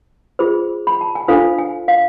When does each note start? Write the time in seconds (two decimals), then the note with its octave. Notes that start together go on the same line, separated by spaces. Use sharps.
0.39 F4 G#4 C5
0.87 B5
1.01 A5
1.15 G#5
1.28 D4 F4 A4 C5 F5
1.59 G#5
1.88 F5